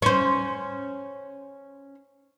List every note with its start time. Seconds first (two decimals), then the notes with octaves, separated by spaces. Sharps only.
0.02 C#4 C5